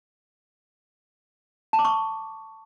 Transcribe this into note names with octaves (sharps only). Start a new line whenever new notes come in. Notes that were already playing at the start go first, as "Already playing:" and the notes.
A5
D6
C#6